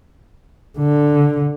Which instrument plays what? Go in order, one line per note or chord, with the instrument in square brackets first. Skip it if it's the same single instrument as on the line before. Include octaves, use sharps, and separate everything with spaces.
[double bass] D3